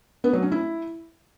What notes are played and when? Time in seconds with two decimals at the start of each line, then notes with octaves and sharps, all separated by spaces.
0.24 B3
0.33 F#3
0.42 C#4
0.52 E4